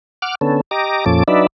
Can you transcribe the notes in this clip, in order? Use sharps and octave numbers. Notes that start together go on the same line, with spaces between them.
F#5 D6 F6
D3 B3 C#4 A4
G4 D#5 A#5 D6
F2 A#2 F3 C#4 A4 D6
F#3 D4 D#4 B4 D5 E5